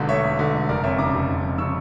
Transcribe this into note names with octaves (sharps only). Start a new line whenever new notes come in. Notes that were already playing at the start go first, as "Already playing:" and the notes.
Already playing: E1 E2 D3
A3 C#5 E5
E2
D3
E1
F1 A#4 D5
F2 C#5 E5
C#3 A#5 D6
F1
F1
F2
C#3 C#6 E6